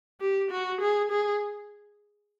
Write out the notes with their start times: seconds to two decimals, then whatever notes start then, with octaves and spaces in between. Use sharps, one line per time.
0.21 G4
0.51 F#4
0.81 G#4
1.11 G#4